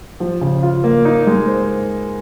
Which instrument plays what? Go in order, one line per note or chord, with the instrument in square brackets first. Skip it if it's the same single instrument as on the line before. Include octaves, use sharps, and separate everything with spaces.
[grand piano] F3
C#3
F4
A#3
D#4
G#3
C5